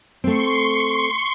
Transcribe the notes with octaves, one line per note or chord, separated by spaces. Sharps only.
A3 C4 C6 C#6